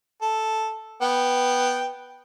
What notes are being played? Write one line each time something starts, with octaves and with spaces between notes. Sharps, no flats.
A4
B3 G5